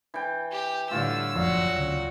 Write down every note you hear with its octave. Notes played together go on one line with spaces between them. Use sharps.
E3 G5
G4
A2 D3 G3 F4 C#5 E6
F#1 F2 A#2 F3 F#3 F#4 F5
D2 C#3